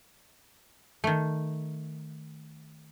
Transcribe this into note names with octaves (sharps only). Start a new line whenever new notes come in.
D#3 A3